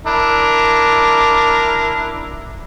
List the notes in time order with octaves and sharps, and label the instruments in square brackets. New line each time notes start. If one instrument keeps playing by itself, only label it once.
[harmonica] D4 E4 A#4